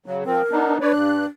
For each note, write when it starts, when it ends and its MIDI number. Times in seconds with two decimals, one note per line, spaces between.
0.06 0.24 49
0.06 0.24 54
0.25 0.42 53
0.25 0.42 60
0.25 0.79 70
0.51 0.78 59
0.51 0.78 62
0.51 0.78 63
0.81 1.25 62
0.81 0.92 71
0.81 0.92 73
0.81 0.92 74
0.93 1.26 43
0.93 1.26 90